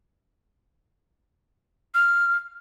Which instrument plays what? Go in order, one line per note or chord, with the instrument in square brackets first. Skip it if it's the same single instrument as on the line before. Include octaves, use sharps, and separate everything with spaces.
[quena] F6